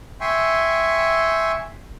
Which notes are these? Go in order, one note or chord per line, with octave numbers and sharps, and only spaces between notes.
E5 G5 G#5 C6 C#6